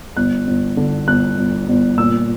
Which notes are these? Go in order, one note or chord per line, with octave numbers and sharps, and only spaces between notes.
G1 F#6
G1
D3
G1 F#6
G1
G1
A#2 E6